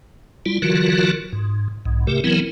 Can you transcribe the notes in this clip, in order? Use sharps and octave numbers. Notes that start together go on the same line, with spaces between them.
G3 E4 F4
D3 E3 F#3 F4 F#4 A#4
G#2
B1 G#2
C3 A3 G4 A#4
E3 F#3 B3 C4 E4 A#4